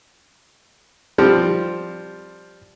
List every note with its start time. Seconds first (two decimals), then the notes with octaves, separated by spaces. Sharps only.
1.18 F3 G3 C4